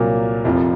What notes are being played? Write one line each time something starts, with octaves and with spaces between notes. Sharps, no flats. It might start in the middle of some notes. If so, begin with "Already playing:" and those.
Already playing: C2 A#2 F#3 A#3
F1 F2 C3 F3